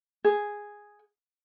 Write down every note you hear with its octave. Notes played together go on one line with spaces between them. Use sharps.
G#4